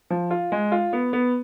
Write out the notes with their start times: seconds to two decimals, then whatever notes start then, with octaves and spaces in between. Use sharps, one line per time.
0.10 F3
0.31 F4
0.52 G#3
0.72 F4
0.93 B3
1.13 B3